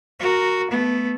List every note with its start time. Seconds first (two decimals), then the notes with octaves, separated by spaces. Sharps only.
0.20 F#4 A#4
0.71 A3 B3